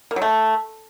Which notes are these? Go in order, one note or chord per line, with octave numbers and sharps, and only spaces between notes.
A#3
F#3
A3